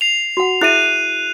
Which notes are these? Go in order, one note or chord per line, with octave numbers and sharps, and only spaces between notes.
C7 F7
F#4 F#5
E4 G#4 E5 F#6 D#7